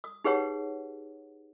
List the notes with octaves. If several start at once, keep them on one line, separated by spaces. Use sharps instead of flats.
D#6
D#4 G4 G#4 B4 C#5 F#5